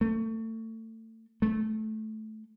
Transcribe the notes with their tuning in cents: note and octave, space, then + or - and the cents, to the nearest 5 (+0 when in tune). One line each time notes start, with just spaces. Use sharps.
A3 +30
A3 -15